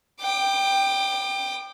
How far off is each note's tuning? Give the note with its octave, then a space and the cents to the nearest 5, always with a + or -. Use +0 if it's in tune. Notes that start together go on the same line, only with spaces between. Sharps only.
G5 +0 D6 +35